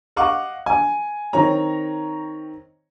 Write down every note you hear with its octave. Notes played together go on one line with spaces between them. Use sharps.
D#5 F5 F#5 C#6 D6
G#5
D#3 C4 C#5 A#5